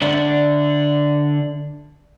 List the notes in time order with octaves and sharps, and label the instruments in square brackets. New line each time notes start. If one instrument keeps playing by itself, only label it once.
[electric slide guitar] D3 D4 D5 E5 F#5